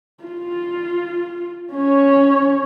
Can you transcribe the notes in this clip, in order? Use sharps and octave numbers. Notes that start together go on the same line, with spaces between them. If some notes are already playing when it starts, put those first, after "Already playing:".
F4
C#4 C#5